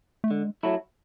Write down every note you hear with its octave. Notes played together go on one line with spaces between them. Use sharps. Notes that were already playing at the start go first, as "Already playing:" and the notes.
A3
D3 G#3
F#3 A3 E4